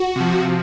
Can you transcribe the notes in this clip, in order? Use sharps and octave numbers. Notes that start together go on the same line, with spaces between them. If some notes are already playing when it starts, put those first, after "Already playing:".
Already playing: F#4
C3 F3